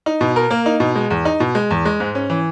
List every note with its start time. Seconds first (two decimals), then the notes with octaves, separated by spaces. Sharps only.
0.06 D#4
0.21 B2
0.36 A#4
0.51 A#3
0.66 D#4
0.80 B2
0.96 G#3
1.10 E2
1.25 D#4
1.40 B2
1.55 G#3
1.71 E2
1.85 G#3
2.00 G#2
2.15 C#4
2.30 E3